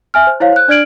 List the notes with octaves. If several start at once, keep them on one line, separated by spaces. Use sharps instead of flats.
E5 G#5 F6
C5
E4 C5 C#5 F5
C5 F#6
D4 D5 F6 G#6 D7 F#7